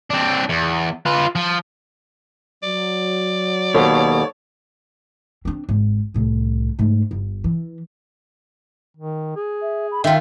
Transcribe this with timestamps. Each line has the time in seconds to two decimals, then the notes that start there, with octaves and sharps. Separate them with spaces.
0.10 C4 D4
0.49 E2
1.06 F4 B4
1.36 F3
2.63 F#3 D5
3.74 D#2 B2 A4 C5 C#5
5.45 C4 D4
5.69 G#1
6.14 C2 A2
6.79 G#2 A3
7.11 G1
7.44 E3
8.97 D#3
9.36 G#4
9.62 E5
9.91 B5
10.04 D#3 F4 E5 G5